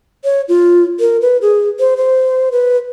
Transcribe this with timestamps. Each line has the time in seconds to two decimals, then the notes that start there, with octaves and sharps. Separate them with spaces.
0.24 C#5
0.49 F4
1.00 A#4
1.21 B4
1.42 G#4
1.79 C5
1.97 C5
2.52 B4